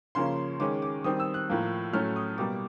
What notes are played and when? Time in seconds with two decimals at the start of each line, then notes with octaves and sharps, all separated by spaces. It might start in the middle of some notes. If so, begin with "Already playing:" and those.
0.15 C#3 F3 A#3 C#4 C6
0.60 D#3 G#3 C#4 D6
0.82 D6
1.04 D#3 G3 C4 D#6
1.20 E6
1.34 F#6
1.49 A2 F3 A#3
1.93 A2 F#3 A3 C#4 F6
2.16 D#6
2.38 B2 G3 A#3 D6